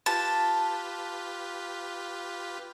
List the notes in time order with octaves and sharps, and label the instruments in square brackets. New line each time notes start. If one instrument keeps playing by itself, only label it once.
[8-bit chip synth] F4 G4 B4 [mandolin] A5